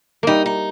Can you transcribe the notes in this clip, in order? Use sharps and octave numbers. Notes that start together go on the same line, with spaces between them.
G3 A#3 D#4
D#4